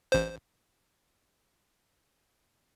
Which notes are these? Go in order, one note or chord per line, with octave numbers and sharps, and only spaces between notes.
A1 C5